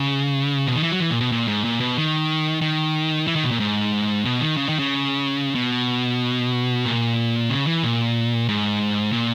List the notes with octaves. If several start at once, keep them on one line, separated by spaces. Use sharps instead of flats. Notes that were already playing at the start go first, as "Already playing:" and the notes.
Already playing: C#3
B2
D#3
E3
F#3
E3
A#2
B2
A#2
G#2
A#2
B2
D#3
D#3
E3
D#3
B2
A#2
G#2
B2
D#3
C#3
D#3
C#3
B2
A#2
C#3
E3
A#2
G#2
A#2